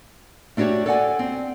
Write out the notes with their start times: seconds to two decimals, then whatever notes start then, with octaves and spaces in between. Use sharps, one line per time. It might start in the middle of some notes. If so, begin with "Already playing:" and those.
0.57 A3 D4 F#4 G4 C#5
0.86 A4 D5 F#5 G#5
1.19 C4